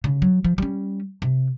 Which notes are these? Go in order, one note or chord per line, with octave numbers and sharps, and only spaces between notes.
C#3
F#3
F3
G3 C#4
C3